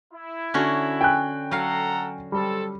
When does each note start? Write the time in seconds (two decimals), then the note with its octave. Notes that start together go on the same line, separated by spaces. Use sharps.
0.12 E4
0.54 D3 C#4 F#4
1.01 G5 G#5 F#6
1.51 F#3 A4 F5 F#5 A#5
2.32 G3 C4 A4